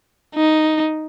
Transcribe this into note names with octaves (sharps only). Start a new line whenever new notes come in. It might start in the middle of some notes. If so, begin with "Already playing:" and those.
D#4